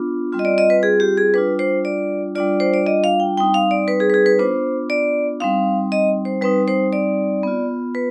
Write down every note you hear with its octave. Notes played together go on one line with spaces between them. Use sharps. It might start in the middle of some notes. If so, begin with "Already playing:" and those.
Already playing: B3 D4 F4
G3 C4 F4
D#5
D5
D#5
B4
G#4
G4
G#4
G3 D4 F4 B4
C5
D5
G3 D4 F4 D5
C5
D5
D#5
F5
G5
G3 C4 D#4 G5
F5
D5
B4
G#4
B4
G#4
B4
B3 D4 F4 C5
D5
G3 C4 D#4 F5
D#5
C5
G3 C4 D#4 B4
C5
D5
B3 F4
B4